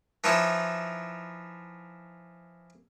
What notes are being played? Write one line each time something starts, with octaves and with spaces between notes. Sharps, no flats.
E3 F3 D#4 E4 C#5